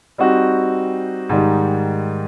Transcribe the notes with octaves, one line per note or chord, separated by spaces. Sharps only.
G3 C4 D#4 F#4
G#2 D#3 G3